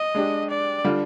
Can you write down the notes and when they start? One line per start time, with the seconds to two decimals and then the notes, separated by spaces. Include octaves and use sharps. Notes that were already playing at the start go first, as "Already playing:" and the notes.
Already playing: D#5
0.15 G#3 D4 G4
0.50 D5
0.84 D3 G3 D4 F4